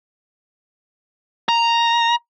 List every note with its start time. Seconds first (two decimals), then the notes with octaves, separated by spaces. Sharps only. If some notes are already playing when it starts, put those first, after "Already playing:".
1.49 A#5